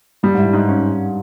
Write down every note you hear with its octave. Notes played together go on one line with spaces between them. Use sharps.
G2 G3
G#2 E4
G2
G#2
C#4